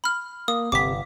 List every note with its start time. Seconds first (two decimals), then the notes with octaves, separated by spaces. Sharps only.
0.04 B5 F6
0.48 A#3 D#6
0.72 G1 C3 D6 B6